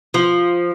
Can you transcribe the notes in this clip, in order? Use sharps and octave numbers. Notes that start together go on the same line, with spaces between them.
F3